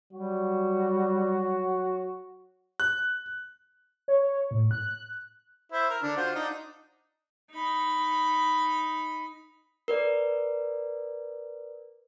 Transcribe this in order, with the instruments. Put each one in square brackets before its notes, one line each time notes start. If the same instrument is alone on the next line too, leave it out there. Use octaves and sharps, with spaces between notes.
[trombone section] F#3 F#4 [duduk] G3
[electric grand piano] F#6
[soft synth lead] C#5
A2
F#6
[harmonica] E4 C5 E5
A#4
D3 D4
F4 F#4 C5
D4 D#4
[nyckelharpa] D#4 B5
[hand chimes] A#4 B4 D5